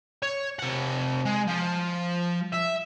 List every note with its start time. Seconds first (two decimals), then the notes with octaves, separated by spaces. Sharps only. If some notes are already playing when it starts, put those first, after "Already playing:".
0.23 C#5
0.59 C3 F#5
1.25 G#3
1.47 F3
2.54 E5